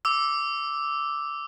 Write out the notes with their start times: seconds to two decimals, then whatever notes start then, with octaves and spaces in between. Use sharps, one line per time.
0.05 D6 E6